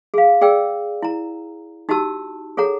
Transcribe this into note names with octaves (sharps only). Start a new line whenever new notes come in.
G#4 F5
G#4 D5 G5 E6
E4 A#5
D#4 F#4 G4 A5 E6
G#4 A4 C#5 F#5 A#5